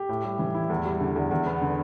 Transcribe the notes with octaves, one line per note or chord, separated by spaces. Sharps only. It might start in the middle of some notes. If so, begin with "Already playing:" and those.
Already playing: G4
A2
G3
E3
E4
E2
G3
D3
E2
E2
B3
D3